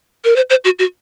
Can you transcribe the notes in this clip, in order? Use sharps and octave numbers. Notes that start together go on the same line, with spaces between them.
A#4
C5
C5
F#4
F#4